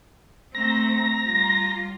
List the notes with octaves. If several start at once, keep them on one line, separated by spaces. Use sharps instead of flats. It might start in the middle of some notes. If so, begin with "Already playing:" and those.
A3 C4 A#5 A#6
G3 F4